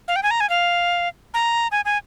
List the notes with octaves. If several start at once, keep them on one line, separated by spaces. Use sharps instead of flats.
F5
G5
G#5
A#5
G#5
F5
A#5
G#5
G#5